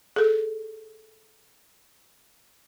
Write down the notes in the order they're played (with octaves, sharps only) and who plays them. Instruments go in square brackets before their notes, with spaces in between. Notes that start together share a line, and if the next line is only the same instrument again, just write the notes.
[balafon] G#4 A4